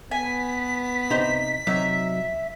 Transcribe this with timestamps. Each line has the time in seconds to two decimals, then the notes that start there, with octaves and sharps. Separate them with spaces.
0.11 B3 G#5 B6
1.10 C3 D#4 C5
1.67 C3 F#3 D#4 E5